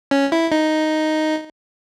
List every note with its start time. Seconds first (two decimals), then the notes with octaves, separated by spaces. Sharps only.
0.11 C#4
0.32 E4
0.52 D#4